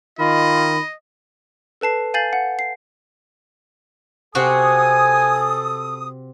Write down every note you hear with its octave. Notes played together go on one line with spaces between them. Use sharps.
D#3 F4 D#5 B5
A4 B4 A5 C7
F5 G#5 G6 A6 C7 F#7
F#5
C7
C3 C4 F#4 A4 G#5 D#6